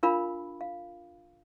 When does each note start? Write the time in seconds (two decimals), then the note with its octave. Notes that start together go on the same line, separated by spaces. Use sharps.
0.03 D4 F4 A#4 F5 B5
0.61 F5